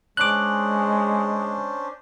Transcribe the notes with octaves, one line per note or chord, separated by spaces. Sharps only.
G#3 C#4 D4 C5 D6 F#6